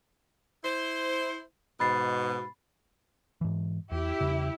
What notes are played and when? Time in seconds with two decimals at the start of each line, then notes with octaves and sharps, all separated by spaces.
0.64 E4 C5
1.80 G#2 B2 B5 A6 C7
3.41 G#2 E3
3.92 E2 E4 G4
4.21 E2 C#3